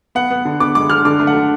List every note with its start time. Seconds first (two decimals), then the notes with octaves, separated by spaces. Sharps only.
0.15 B3 F#5
0.30 B3
0.45 D3
0.60 B3 D6
0.75 G#3 D6
0.90 D3 F6
1.05 D3 D6
1.20 A3
1.27 F#5
1.35 D3